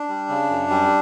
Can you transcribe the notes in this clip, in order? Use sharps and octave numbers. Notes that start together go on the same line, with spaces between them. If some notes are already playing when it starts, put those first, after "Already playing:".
Already playing: D4
G3
C#3
F#2
G3